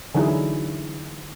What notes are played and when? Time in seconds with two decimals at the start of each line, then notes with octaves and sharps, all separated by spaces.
0.15 D3 E3 F#3 D#4 E4 G#4